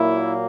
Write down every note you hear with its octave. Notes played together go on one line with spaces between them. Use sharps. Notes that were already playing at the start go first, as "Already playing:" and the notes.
Already playing: A#2 F#3 A#3 E4